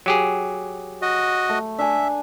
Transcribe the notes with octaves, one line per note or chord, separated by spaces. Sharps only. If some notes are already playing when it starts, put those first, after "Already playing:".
F#3 G4 G#4
F#4 D#5
A3
D4 E5 G#5